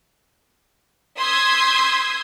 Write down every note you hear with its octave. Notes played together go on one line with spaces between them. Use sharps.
C6 D#6 E6 G6 G#6 B6